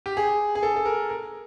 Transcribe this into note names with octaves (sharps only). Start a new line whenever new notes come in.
G4
G#4
G#4
A4
A4
A#4
A#4